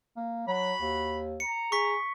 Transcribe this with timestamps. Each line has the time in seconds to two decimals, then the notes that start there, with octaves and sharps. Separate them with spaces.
0.17 A#3
0.48 F#3 F#4 B5
0.81 D#2
1.40 A#5 C#7
1.72 G#4 C#6 B6